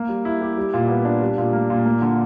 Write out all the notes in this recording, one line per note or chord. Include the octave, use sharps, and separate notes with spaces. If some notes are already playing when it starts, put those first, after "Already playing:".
Already playing: A#3
G3
E4
G4
G3
A#2
B3
D4
G3
A#2
A#3
A#2
A#3
D3